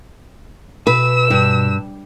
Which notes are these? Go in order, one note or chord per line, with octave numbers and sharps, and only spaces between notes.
B2 B4 E6
G2